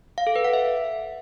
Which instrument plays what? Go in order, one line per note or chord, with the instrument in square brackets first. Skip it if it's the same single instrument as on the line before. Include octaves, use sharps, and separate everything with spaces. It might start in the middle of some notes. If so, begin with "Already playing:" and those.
[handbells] F5
A4
B4
F#5
E5